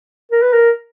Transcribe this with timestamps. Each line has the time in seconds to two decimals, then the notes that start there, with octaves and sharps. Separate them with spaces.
0.32 A#4
0.42 B4
0.53 A#4